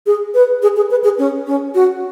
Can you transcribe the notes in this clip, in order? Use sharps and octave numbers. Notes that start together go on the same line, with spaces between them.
G#4
B4
G#4
G#4
B4
G#4
C#4
C#4
F#4